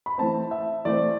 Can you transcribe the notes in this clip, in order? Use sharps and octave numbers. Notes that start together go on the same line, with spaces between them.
B5
E3 A3 C4 A5
E5
E3 A3 C4 D5